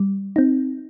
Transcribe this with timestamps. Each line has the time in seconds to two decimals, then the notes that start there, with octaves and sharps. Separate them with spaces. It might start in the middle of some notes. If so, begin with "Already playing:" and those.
Already playing: G3
0.36 C4 D#4